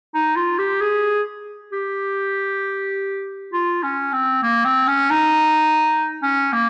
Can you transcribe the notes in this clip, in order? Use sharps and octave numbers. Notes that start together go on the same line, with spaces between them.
D#4
F4
G4
G#4
G4
F4
C#4
C4
A#3
C4
C#4
D#4
C#4
A#3